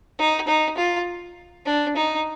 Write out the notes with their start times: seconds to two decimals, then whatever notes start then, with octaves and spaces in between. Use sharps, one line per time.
0.19 D#4
0.47 D#4
0.77 F4
1.66 D4
1.96 D#4